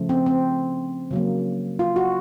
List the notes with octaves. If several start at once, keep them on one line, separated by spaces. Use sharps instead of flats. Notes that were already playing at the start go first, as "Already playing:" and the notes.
Already playing: C#3 F3 A3
C4
C4
C#3 F#3 A#3
F4
F#4